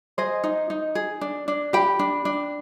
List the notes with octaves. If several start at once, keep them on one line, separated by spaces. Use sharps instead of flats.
G#4 C5 D#5
D#4
D#4
G#4
D4
D4
G4 G5 B5
D4
D4